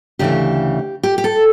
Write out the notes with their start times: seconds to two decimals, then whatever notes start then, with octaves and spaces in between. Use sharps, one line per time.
0.19 D2 C#3 E3 G4
1.03 G4
1.18 G4
1.24 A4